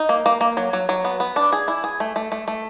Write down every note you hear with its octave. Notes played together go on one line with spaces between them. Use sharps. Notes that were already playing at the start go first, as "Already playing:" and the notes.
Already playing: D#4
A#3
A#3
A#3
F#3
F#3
F#3
B3
B3
D4
G#4
E4
G#4
A3
A3
A3
A3